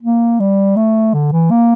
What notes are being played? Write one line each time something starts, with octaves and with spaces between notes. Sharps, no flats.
A#3
G3
A3
D3
E3
A#3